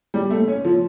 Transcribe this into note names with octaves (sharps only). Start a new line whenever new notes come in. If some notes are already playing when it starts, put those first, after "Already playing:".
G3
A3
C#4
F3